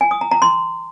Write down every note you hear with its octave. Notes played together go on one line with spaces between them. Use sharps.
G#5
D#6
A#5
A#5
C6